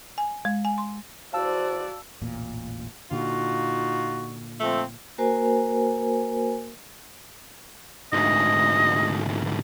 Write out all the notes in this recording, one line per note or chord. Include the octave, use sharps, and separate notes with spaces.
G#5
G#3
G#5
C6
E2 F#4 C5 D5 F5 A5 E6
E1 A1 A#2
A#2 D3 D#4 F4 F#4
F3 A3 C4
A#3 F#4 A#4 C5 G#5
D2 G#2 D#5